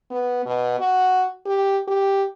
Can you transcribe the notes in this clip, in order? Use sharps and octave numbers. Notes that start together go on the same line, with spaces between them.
B3
B2
F#4
G4
G4